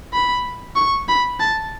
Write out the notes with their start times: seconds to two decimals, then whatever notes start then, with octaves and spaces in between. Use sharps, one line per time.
0.13 B5
0.76 C#6
1.08 B5
1.39 A5